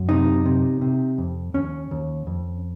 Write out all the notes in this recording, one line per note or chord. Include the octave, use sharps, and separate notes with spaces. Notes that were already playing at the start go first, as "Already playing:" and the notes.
Already playing: F#2
C3 D#4
C3
C3
F2
D#2 C#4
D#2
F2